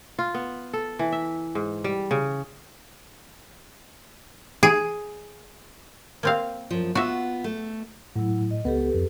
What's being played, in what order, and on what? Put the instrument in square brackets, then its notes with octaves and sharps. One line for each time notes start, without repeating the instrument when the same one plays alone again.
[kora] F4
B3
A4
E3
E5
G#2
G3
C#3
[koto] G#4
A#3 C4 F5
[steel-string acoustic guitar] F#2 F3
[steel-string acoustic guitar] B3 F4 [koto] F#4 E5
[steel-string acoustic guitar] A3
[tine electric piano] A2 [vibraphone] F#3 E4
[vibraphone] D#5
[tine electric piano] C#2 B3 [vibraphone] G4 A4 B4
[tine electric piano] F2